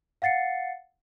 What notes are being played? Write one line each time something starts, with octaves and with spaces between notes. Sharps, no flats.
F5 F#5 A6 C7 C#7